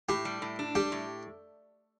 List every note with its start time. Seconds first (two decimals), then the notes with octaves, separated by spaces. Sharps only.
0.09 A2 G4
0.25 G3
0.42 A2
0.59 D4
0.75 G3 G4
0.92 A2